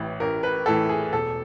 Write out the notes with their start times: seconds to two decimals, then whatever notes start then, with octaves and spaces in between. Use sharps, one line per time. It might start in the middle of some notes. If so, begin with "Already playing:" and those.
Already playing: A1 A2 E3
0.20 A1 A#4
0.43 B4
0.66 A2 E3 A4
0.89 G#4
1.13 E1 A4